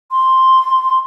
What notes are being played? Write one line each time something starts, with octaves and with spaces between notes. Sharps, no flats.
C6